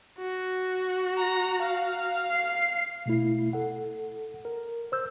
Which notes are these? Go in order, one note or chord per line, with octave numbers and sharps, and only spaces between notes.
F#4
A#5
F5
C7
B2 A3 E4
A4 F#5
A#4
C5 E6 G6